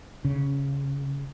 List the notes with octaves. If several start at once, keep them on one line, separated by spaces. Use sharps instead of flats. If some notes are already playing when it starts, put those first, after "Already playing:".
C#3